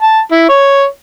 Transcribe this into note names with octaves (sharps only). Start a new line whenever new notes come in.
A5
E4
C#5